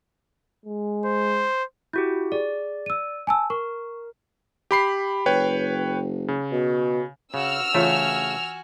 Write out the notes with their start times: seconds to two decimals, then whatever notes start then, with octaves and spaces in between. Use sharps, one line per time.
0.65 G#3
1.05 C5
1.93 E4 F#4 G4 G6
2.32 G#4 D5
2.86 E6 D#7
3.27 G#5 A5 E6
3.50 A#4 C#6
4.71 G4 B5 C7
5.26 F#1 B4 C#5 G5
6.28 C#3
6.52 B2
7.34 C#3 F#4 E6 F6
7.75 C#3 E3 A3 F4 F#4 G#5